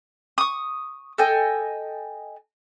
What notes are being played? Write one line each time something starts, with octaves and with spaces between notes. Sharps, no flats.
C#6 D#6
A4 D#5 G5 G#5